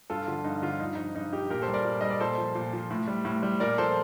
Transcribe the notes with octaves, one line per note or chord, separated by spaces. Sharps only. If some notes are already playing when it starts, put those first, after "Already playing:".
G2 F4 A4
D3 F3 F4
G2 D#4
D3 F3 F4
G2 D#4
F3 D#4
G2 D#4
F3 D#4 G4
A#2 G4 A#4
A4 C5
G3
A#4 D5
A#2
G3 D#5
D5
A#2 A4 C5
F3
A#2
F3
A2
G3
A2
G3
A#2 A#4 D5
F3 A4 C5